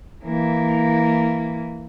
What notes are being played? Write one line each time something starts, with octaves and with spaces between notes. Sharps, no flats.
E3 A#3